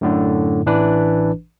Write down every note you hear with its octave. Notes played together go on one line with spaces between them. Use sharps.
F#2 A2 D3
A1 E3 D4 B4